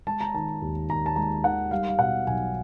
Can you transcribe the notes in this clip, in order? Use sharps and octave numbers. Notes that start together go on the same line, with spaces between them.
G#3 A5
A#5
D#3 A5
D#2
D#2 A#5
A5
G#3 A#5
D#3 F#5
G3 F5
F5
B2 F#5
B1 G#5